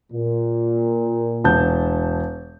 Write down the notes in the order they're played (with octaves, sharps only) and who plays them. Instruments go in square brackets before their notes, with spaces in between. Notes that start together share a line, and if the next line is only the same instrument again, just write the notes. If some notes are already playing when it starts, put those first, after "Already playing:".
[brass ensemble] A#2
[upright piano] E1 A5 G6